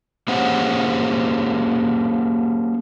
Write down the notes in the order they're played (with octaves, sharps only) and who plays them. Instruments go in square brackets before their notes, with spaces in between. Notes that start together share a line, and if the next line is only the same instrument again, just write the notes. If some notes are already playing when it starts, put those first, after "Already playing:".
[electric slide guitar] A#3 C#4 G4 G#4 C5 F#5